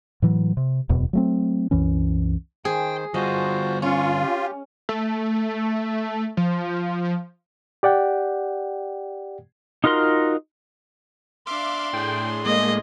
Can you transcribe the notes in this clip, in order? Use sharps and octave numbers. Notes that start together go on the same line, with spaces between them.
A2 E3 F#3
C3
D1 E2 B2
F#3 A3 C4
C2 F#2 E3 C#4
D#3 G#4 C5 G5
D3 G3 F4 F#4 C5 D#5
C#4 F4 C#6
G4
A3
F3
G4 D5 F#5 G5
D#4 F4 F#4 A#4 C6
D4 E5 F5 C6 D6
A2 G#4 G5
G#3 A#3 D#5